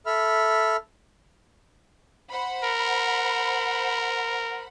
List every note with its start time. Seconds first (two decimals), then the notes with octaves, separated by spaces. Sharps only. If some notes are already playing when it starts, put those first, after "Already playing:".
0.06 A4 E5 B5 F6
2.31 C5 F#5 B5
2.64 A#4